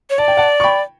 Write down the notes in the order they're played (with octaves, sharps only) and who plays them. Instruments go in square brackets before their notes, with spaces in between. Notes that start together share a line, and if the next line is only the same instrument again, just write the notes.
[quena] C#5
[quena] D5 [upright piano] A5
[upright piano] G5
F#5 A5
C#6
G5 B5